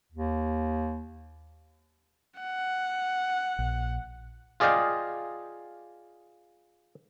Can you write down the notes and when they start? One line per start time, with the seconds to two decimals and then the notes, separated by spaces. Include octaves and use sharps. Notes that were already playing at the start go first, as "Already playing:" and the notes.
0.12 D#2
2.40 F#5
3.59 A#1
4.60 F4 G#4 D5 D#5 F5 G5